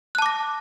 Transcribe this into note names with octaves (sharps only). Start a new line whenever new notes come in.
A5 D6 F#6 A#6